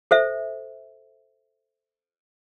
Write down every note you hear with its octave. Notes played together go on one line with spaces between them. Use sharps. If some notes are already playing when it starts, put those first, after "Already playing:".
A4 C5 E5